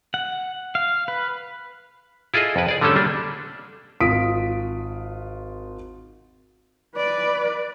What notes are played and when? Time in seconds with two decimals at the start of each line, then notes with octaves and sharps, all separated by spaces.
0.14 F#5
0.75 F5
1.08 B4
2.34 E4 F4 G#4 A4 D#5
2.56 F2 B4
2.68 G#4 D5
2.81 D3 G3 A3 C#4 A4
2.96 G3 A#3 D4
4.00 G#1 F4 D#6 B6 D7
6.96 B4 D5